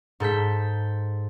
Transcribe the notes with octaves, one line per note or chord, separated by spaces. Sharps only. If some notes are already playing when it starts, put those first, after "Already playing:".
G#2 A4 G6 B6